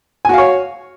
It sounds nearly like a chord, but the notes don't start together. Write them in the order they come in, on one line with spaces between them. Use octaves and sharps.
G#5 F#4 F5 C#5